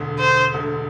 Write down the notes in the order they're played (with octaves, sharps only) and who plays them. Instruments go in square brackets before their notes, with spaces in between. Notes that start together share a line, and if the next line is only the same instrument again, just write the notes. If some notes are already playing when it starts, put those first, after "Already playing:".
Already playing: [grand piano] E1 D2 D3
[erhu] C5
[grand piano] E1 D2 D3